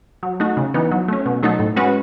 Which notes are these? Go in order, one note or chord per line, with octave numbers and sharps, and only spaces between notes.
F#3
A3 D#4 F#4
C#3
E3 B3 D#4
F#3
A3 C#4
B2
F#3 A3 D#4 A4
A2
G#3 C#4 F#4 B4